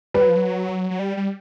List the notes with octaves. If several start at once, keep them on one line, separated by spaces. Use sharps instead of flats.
G3 B4
F#3
F3
F#3
F#3
G3
G3